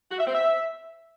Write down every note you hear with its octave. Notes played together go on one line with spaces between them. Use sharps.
F#4
E5
C4
E5